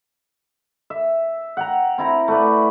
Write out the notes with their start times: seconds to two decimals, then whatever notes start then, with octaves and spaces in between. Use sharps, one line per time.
0.90 E5
1.57 F#5 G5 A#5
1.98 C4 E4 A#5
2.28 A3 B4 D5